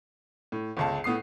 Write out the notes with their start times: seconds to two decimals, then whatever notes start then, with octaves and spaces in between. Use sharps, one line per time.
0.52 A2
0.77 G1 C#2 A5
1.04 A2 B3 D#6 C7